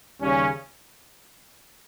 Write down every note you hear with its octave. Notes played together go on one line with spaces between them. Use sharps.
D#2 C#3 G3 C#4